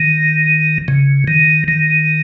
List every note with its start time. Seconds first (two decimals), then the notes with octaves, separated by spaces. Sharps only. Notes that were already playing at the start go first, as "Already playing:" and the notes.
Already playing: D#3
0.88 C#3
1.28 D#3
1.68 D#3